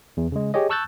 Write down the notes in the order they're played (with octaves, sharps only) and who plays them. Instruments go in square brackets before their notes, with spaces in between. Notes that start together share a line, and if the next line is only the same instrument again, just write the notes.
[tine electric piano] E2
C#3 G#3
G4 G#4 C#5 D#5
A5 C#6 E6 F#6 G6 A6